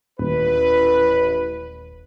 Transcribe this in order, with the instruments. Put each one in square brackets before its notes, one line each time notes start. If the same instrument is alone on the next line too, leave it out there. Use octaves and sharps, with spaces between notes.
[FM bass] D#1 [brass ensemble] A1 B4